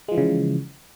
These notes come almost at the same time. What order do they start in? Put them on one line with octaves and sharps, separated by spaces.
G#3 F3 E3 C#3